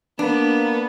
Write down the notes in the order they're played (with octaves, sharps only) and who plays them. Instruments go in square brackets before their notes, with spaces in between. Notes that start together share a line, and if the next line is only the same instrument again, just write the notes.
[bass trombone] A#3 [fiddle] B3 [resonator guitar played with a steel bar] D4